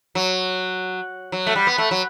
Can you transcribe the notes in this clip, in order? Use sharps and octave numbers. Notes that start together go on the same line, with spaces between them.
F#3
F#3
A3
G3
B3
A3
F#3